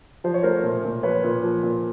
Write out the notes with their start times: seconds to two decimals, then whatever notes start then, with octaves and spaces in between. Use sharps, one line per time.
0.24 F3 C5
0.34 C#5
0.43 A3 A#4 C5
0.63 A#2
0.84 A#2
1.03 F3 B4 C#5
1.24 A#2
1.43 F3
1.63 A#2